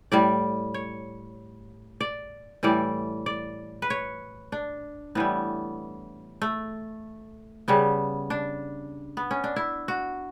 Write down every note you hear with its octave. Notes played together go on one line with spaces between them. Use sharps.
A2 G3 D5
C#5
D5
A2 E3 G3 D5
D5
B4
C#5
D4
A2 E3 G3 B3
A3
C#3 G3 B3
D4
B3
C#4
D4
E4
F#4